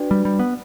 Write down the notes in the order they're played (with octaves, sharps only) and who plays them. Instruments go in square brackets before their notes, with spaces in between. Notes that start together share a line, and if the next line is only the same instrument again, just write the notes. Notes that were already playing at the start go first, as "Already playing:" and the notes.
Already playing: [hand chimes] D4 F#4 B4 D5 G5
[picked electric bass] G3
G3
B3